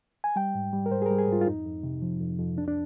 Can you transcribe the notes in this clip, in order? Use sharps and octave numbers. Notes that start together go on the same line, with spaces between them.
G#5
G3 G5
G#2
G3
A#4
G#2 C5
G#4
G3 A#4
G#4
G#2 F4
F4
F2 D#4
F2
C3
F3
F2
F2
C2 D4
D4